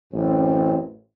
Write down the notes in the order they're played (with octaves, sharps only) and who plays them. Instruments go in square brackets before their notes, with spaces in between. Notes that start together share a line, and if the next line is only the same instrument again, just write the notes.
[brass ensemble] A1 F#2 C4